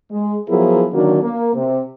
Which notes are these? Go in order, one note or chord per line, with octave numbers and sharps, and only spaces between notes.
G#3
F3 F#3 B3 E4 G#4 A#4
D3 D#3 F#3 A#3 C#4 D4
A#3
C3